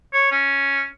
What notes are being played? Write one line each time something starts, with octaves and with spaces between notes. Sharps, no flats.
C#5
C#4